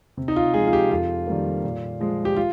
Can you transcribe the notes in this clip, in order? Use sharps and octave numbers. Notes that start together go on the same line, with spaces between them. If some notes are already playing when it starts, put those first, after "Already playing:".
C3
D#4
F4
F3 G#3 G#4
F4
G4
F2 F4
D#3 G3 A#3
A#2
F3 G#3
G4
F4